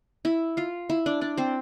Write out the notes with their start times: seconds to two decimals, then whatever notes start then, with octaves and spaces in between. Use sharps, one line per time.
0.25 E4 E5
0.57 F4 F5
0.89 E4 E5
1.06 D4 D5
1.21 D4 D5
1.37 C4 C5